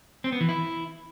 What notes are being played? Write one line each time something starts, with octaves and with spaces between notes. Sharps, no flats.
C4
B3
E3
E4